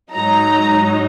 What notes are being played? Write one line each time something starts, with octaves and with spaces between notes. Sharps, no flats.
G#2 F#3 D#4 A#5